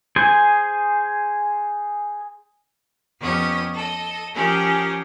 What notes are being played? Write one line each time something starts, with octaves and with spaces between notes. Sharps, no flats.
G#4 C5 G#5
F2 B3 C#4 G4 D#6
A4 D#5
F3 C#4 G4 G#4 A#4